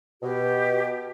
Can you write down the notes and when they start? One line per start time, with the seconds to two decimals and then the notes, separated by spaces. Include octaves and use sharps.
0.22 B2 G4